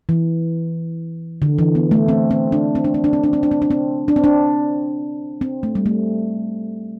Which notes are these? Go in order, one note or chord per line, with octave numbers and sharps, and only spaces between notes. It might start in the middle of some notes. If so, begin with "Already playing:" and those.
E3
D3
E3
B3
A3
C4
C4
D4
C4
D4
C4
D4
C4
D4
C4
D4
C4
D4
C4
D4
C4
D4
C4
A3
G3
A3